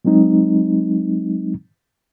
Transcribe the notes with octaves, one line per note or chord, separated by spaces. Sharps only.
F#3 G#3 C4 D#4